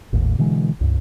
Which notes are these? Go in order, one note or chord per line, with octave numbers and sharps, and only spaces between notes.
G#1 D#2 A2
B2 D3 E3 G#3
C#2 G2